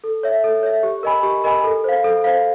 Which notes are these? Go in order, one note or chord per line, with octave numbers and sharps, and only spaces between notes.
A4
C#5 E5
A4
C#5 E5
G4
A#4 D#5 G#5 B5
G4
A#4 D#5 G#5 B5
A4
C5 F5
A4
C5 F5